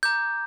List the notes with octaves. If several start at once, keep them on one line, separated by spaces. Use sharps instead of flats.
A#5 D6 G6